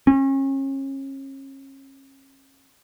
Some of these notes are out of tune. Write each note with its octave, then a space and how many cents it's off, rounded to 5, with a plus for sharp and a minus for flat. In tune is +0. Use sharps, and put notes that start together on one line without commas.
C#4 -35